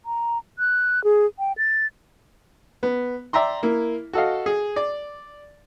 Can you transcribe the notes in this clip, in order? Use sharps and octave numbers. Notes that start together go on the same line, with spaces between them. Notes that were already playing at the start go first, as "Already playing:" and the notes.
A#5
F#6
G#4
G5
A6
B3
D5 E5 G5 A#5 C6
A#3 E4
F#4 A4 D#5 F5
G#4
D5